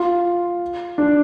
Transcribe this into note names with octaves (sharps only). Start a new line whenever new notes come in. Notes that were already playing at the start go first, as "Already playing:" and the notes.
Already playing: F4
D4